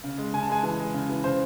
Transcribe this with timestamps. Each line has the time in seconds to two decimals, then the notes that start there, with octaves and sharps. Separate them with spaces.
0.04 C#3
0.18 G#3
0.33 C#3 G#5
0.43 A5
0.49 G#3 G#5
0.63 E3 G#5
0.79 G#3
0.94 C#3
1.09 E3
1.24 C#3 C5